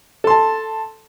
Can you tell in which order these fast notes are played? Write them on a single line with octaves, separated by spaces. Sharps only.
A4 C6 A5